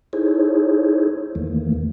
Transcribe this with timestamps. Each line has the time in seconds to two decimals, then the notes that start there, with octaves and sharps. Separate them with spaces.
0.13 D#4 E4 G#4 A4 C5 C#5
1.35 E2 D#3 E3 A3 A#3